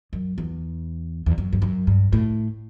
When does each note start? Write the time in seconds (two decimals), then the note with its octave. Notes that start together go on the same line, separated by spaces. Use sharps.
0.13 F#2
0.38 E2
1.26 E2
1.38 F#2
1.53 G2
1.62 F#2
1.87 G2
2.13 A2